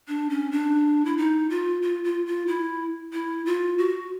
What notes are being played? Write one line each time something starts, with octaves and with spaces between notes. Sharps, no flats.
D4
C#4
D4
E4
D#4
F4
F4
F4
F4
E4
E4
F4
F#4